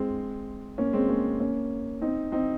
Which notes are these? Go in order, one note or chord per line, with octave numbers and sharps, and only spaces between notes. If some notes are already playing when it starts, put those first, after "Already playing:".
Already playing: G#3 C4
A#3 C#4
G#3 C4
A#3 C#4
A#3 C#4
C4 D#4
C4 D#4